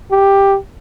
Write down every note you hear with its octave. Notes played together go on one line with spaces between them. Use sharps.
G4